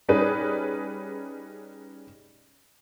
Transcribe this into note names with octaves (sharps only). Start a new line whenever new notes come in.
G3 C#4 D#4 G#4 B4